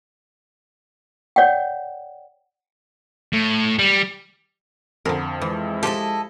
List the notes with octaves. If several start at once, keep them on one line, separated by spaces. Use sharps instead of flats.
C#5 D5 F#5 G5
A2
G3
F2 D3 F3 A#4
E3 G#3 E4
F3 F4 G4 A4 D#5